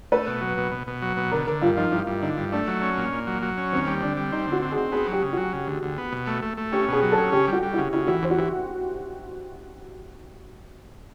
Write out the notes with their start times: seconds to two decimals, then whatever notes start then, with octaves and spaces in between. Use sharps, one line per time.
0.12 A3 B4
0.27 B2
0.41 F#3
0.58 B2
0.72 B2
0.87 B2
1.02 F#3
1.17 B2
1.31 D3 A#4
1.47 D3 A#4
1.62 G2 F4
1.77 F3 D#4
1.91 G2 E4
2.07 G2
2.22 D3 D#4
2.37 G2
2.52 A3 D4
2.67 F#3
2.82 C#4
2.97 A#2
3.12 A#2
3.27 F#3
3.42 F#3
3.57 C#4
3.72 D#2 C4
3.87 G3
4.02 D3 D4
4.17 G3
4.32 C4 D#4
4.47 D3 F#4
4.62 C4
4.72 G#4
4.77 C4
4.92 B3 G#4
5.07 F#3 G4
5.22 C#3
5.33 F#3 F#4
5.53 C#3
5.67 D2
5.83 D2
5.98 B3
6.12 B2
6.27 A3
6.42 A3
6.57 A3
6.72 C#4 G4
6.88 B2 G#4
7.02 F#3
7.12 A4
7.18 C#4
7.32 C#3 G4
7.48 G3 F#4
7.63 G3
7.73 C#3 E4
7.92 C#3 E4
8.07 E3 F#4
8.22 E2 C5
8.30 F#4
8.37 E3 G4